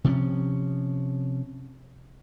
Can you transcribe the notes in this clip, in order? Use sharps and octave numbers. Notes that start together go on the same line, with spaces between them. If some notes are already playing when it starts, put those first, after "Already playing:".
C3 F3 C4 C#4